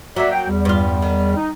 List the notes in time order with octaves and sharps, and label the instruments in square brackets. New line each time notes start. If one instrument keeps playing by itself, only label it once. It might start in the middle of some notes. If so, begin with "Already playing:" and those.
[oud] F#3 A#3 [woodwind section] D5 E5
[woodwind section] G5
E2 G3
[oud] G2 F4
D#3
[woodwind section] D#4